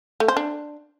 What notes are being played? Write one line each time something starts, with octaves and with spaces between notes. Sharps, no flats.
A3
C5
D4